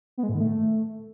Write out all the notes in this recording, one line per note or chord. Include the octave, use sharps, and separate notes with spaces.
B3
G#3
A2
D#3
A3